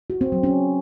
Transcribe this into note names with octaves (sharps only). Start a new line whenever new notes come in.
F#4
C4
F#3
C#4